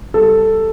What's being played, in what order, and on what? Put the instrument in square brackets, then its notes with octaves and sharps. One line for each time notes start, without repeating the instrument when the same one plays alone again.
[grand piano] G3 A4